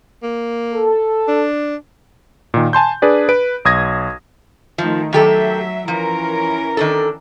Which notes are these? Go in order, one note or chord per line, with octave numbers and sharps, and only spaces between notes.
A#3
A4
D4
A#2 D#3
G#5 A5 C6 G6
D4 G#4 B4 D5
B4 D7
B1 D#6 G#6 A#6
D#3 F3 A3
D#3 F#3 G4 A4 E5
E3 F3 C#4 A#4
D#3 D4 A4